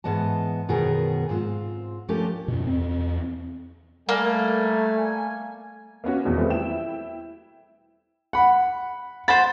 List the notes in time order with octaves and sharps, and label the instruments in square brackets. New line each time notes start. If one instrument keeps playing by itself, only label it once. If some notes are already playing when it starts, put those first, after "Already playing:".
[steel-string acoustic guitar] G#2 E3 B3 D#5 A5
F#2 B2 D#3 B3 G#4 A#4
G#2 C4 F4
F3 A3 A#3 C#4 D4 G4
[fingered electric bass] F#2 B2
E2 C4
[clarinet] G3 [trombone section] A3 [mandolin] A#3 [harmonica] G#5
[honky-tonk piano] A#3 B3 C#4 F#4
E2 B2 D#3 F#3
G3 A3 C4 F4 B4
E4 G5 E7
[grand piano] F#5 B5
[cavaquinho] C5 F#5 B5 [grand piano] A6